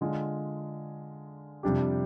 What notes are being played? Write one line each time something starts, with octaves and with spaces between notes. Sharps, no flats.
D3 G#3 D4 F4 G#4
F2 C3 G3 D4 G4